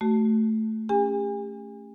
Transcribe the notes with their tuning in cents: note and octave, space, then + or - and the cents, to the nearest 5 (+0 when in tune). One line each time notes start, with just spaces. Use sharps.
A3 +0 F#4 +30
C#4 +0 G4 +40 G#5 -35